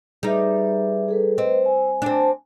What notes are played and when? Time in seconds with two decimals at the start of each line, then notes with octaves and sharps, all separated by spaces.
0.23 G3 D#4 G#4 B4 E5
1.09 G#4 A4 B4
1.38 C4 B4 D#5
1.66 G#5
2.02 C4 D4